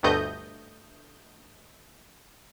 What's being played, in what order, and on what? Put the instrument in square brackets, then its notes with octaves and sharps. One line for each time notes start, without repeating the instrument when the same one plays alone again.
[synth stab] G1 D2 G2 A3 D#5 G6